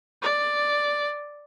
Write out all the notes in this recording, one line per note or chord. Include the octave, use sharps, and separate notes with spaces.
D5